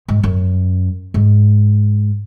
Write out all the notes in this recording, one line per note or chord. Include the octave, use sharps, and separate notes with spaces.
G#2
F#2
G#2